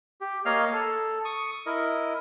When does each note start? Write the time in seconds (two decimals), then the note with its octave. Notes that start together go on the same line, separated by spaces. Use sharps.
0.21 G4
0.45 A#3 C#5 D#5 F5 F6
0.73 A4
1.25 C#6 D#6
1.66 E4 A#4 D#5